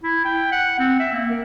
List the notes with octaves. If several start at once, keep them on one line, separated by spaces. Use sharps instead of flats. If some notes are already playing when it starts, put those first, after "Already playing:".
E4
G5
F#5
C4
E5
A#3
A#4